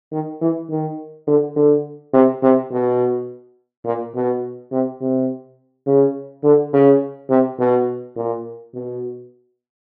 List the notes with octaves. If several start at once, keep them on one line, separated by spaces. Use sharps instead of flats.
D#3
E3
D#3
D3
D3
C3
C3
B2
A#2
B2
C3
C3
C#3
D3
C#3
C3
B2
A#2
B2